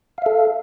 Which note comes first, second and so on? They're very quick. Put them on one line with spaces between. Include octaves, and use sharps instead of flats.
F5 E5 A4